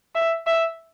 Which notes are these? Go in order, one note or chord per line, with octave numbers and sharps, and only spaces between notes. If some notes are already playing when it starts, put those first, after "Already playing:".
E5
E5